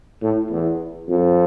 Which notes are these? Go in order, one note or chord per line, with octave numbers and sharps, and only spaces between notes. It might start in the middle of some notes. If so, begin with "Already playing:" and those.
A2
E2
F2